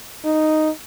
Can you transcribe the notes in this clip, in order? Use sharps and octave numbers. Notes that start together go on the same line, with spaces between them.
D#4